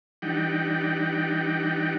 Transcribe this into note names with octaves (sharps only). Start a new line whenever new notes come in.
E3 G3 D4 D#4 F#5 G5